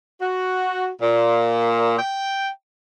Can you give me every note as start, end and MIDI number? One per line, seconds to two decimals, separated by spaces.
0.21 0.89 66
1.01 1.98 46
1.99 2.49 79